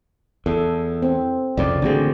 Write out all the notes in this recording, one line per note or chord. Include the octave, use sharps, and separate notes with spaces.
E2 A4
C4
C2 F2 C#3 D5
A1 D3 A#3 C4 F#4 G#4